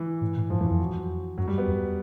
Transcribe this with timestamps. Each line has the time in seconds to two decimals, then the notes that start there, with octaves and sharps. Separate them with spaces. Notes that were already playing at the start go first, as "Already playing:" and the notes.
Already playing: E3
0.21 A2
0.36 A2
0.50 G2 F3
0.60 F#2 E3
0.66 F2 F3
0.80 F#3
1.38 F#2 F#3
1.48 G3
1.58 B3
1.68 F2